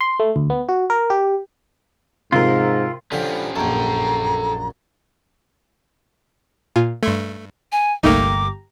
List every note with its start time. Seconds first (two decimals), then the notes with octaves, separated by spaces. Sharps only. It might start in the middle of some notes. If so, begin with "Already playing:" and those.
0.01 C6
0.20 A3
0.36 D2
0.50 B3
0.69 F#4
0.90 A#4
1.10 G4
2.32 G#2 C3 F3 F4 A#4
3.12 D3 F3 C#4 G4
3.56 A#1 F#2 A4 G5 A#5
6.76 A#2 F4 G#5
7.03 G2 A3 C6 C#6 G#6
7.72 G#5
8.03 G1 C2 A3 A#3 D#4 G4 A#5 D6